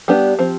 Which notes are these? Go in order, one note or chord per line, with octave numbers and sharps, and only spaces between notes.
G3 B3 D4 G4
F3 C4